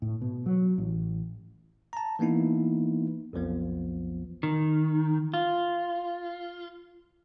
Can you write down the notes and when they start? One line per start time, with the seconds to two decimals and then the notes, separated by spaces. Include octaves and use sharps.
0.02 A2
0.21 B2
0.46 F#3
0.78 A1
1.93 A5 A#5
2.19 E3 A#3 B3 D#4 E4
3.33 B1 F2 F3 B3
4.43 D#3
5.34 F4